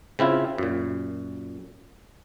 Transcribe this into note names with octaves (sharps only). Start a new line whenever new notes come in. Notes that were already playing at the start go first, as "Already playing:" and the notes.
C#3 C4 E4 F4
F#2 A#2